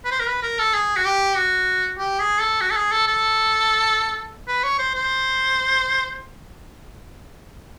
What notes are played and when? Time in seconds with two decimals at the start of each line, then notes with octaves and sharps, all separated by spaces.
0.05 B4
0.11 C5
0.20 A#4
0.27 B4
0.42 A#4
0.59 A4
0.74 G#4
0.96 F#4
1.05 G4
1.36 F#4
1.98 G4
2.19 G#4
2.40 A4
2.61 F#4
2.71 A4
2.77 G#4
2.92 A4
3.07 A4
4.48 B4
4.63 C#5
4.79 C5
4.95 C5